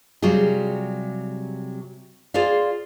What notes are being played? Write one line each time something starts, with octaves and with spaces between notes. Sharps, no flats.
C3 F#3 G3 F4 G#4
F4 G#4 C5 D5 F5